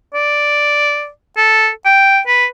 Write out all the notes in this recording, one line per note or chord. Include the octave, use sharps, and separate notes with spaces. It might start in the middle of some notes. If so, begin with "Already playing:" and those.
D5
A4
G5
B4